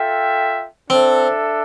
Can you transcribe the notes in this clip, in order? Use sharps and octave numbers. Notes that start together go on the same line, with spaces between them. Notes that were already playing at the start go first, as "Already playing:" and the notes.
Already playing: F4 A4 E5 G5
C4 D4 A4 E5